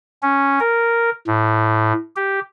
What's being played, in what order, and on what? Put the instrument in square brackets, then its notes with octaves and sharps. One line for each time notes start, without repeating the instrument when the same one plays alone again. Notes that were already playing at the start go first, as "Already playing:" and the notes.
[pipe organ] C#4
A#4
A2
G4